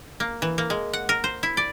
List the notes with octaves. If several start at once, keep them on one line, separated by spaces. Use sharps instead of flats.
A#3
E3
A#3
G#3
F#5
A#4
C5
E4
D5